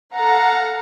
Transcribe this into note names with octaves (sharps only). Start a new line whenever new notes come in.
A4 F5 F#5 A#5